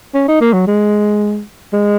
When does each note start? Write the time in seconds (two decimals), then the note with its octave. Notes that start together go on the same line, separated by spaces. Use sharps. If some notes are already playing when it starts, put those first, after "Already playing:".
0.14 C#4
0.28 D#4
0.41 A#3
0.53 F#3
0.67 G#3
1.73 G#3